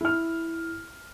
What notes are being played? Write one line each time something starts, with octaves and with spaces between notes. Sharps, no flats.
E4 F6